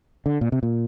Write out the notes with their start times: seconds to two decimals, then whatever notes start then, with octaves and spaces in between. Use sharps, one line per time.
0.26 D3
0.41 A#2
0.52 C3
0.63 A#2